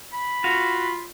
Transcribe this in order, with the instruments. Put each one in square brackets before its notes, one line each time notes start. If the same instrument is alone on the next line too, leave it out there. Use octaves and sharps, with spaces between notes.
[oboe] B5
[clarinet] F4 [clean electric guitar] F#4 F5